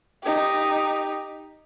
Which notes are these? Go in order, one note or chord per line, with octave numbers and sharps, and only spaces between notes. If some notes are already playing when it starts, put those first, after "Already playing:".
D#4 G4